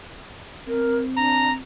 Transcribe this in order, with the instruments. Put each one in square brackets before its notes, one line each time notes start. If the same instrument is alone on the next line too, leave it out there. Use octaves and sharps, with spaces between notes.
[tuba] C4 [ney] A#4
[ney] D4 [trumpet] A#5